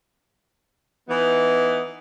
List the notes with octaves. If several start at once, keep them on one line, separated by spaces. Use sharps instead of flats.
E3 B3 D#4